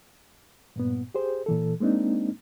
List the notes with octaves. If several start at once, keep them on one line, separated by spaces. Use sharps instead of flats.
G2 A#2 B3
G4 G#4 C5
A#2 E3 A4
G#3 A#3 C4 D4 D#4